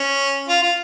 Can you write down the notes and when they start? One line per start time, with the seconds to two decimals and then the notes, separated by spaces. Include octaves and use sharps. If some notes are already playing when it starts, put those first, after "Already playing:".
Already playing: C#4
0.49 F4
0.63 F4